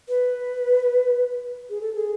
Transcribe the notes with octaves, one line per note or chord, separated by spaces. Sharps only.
B4
G#4
A4
G#4